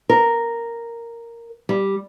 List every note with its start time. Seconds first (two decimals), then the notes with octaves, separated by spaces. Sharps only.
0.09 A#4
1.69 G3